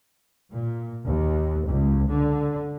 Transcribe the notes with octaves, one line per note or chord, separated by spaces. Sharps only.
A#2
D#2
C#2
D3